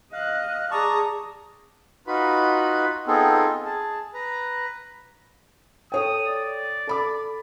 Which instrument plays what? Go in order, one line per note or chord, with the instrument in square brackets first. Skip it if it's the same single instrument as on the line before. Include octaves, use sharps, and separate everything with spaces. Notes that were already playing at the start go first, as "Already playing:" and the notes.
[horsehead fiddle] D#5 [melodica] F5 [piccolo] F#6
[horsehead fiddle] G#4 [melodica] D5 A5 C#6 [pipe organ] A#5 [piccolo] D#6
[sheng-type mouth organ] D#4 F4 F#4 B4 B5
B3 C4 D#4 F4 G#4 A4
G#4 A5
B4 A#5
[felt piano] A4 C#5 G5 [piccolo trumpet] D#6
[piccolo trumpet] D5
[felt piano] A4 B5 D6